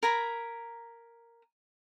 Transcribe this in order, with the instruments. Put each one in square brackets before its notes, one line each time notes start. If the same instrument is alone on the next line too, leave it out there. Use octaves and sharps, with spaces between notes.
[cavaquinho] A#4 G#5 A#5 B5